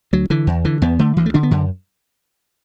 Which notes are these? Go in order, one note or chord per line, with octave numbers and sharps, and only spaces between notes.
D2 F#3
D3 E3
E2
D3 E3
E2 B3
D3 A3
D2 E3
A3
D3 D4
B3
F#2 D3